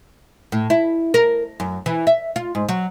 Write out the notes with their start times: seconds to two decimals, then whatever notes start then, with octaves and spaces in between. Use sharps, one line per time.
0.52 A2
0.70 E4
1.14 A#4
1.60 F#2
1.86 E3
2.07 E5
2.36 F4
2.55 G#2
2.69 F#3